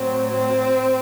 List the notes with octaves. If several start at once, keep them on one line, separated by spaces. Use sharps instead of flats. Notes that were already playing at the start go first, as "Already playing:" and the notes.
Already playing: A2 F#3 C4
C4